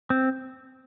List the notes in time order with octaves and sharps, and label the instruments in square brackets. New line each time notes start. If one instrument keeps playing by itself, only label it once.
[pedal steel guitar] C4